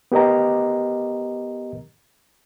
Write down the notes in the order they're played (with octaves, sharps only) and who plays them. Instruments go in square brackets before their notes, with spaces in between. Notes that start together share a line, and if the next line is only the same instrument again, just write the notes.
[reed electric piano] B3 G4 A#4 D#5 A#5